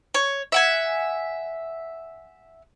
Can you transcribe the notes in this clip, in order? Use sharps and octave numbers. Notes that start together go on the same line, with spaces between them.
C#5
E5 F#5 G#5